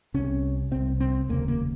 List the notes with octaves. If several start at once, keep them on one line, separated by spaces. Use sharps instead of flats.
C2 C3 C#4
C2 C3 C4
C4
F1 D#2 C#3 A#3
A#3